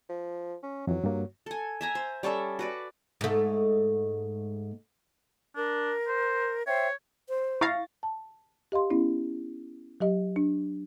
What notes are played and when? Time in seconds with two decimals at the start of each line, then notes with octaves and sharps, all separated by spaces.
0.09 F3
0.63 C#4
0.87 F2 E3 F#3
1.04 G2 A#3
1.46 A4 G#5
1.81 E5 G#5 A#5
1.95 C5
2.23 G3 C#4 A4 E5
2.59 F#4 B4 D5
3.21 G#2 A3
5.56 D4 A#4
6.08 C5
6.67 C5 C#5 E5 G5
7.29 C5
7.61 E4 F5 C#6 A6 A#6
8.03 A5
8.72 G4 D#5 F5 C6
8.90 B3 C#4 E4
10.00 F#3 G4 D#5
10.36 D4